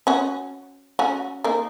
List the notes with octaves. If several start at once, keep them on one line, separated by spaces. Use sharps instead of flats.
C#4 F#4
C#4 F#4
A#3 D#4